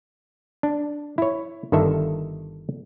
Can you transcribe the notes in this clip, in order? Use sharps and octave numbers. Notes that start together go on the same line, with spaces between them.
D4
E4 C#5
G1 D3 D#3 A4 E5